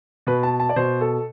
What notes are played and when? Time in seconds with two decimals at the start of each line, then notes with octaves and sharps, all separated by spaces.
0.27 B2 B4
0.43 A5
0.60 A5
0.69 D5
0.76 B2 C5
1.01 A4